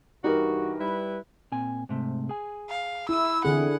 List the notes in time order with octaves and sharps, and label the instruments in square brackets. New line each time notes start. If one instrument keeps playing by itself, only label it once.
[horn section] G2 E3 F#4 [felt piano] D#4 G4 A#4
[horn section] G3 E4 B4
[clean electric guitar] A#2 C4 G#5
G#2 C3 A3
G#4 G#5
[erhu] F5
[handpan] E4 [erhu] E6
[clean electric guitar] E2 C4 [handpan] D3 G#4 [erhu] F#5